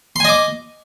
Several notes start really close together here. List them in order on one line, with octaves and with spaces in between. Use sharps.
C6 G#5 D#5 D6